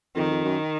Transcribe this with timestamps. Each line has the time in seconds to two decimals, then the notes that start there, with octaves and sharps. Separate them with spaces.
0.15 F2 D#3
0.30 F2
0.44 F#2